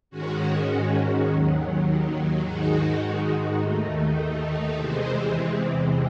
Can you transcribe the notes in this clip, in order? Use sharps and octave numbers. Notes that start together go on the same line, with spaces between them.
G#2 D#3 G#3 C#4 F#4
D#2 D#3 F#3
G#2 D#3 G#3 D#4 F#4
D#2 D#3 A3 D#4
E2 C3 E3 G#3 C4